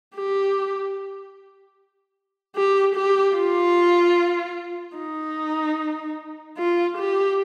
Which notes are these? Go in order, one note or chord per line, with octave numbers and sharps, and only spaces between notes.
G4
G4
G4
F4
D#4
F4
G4